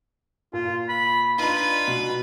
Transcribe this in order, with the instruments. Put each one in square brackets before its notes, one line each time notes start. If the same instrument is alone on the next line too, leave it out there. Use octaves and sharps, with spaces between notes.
[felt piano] A#2 [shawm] F4
[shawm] B5
[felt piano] D4 D#4 [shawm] F4 [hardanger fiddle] B4
[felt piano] B2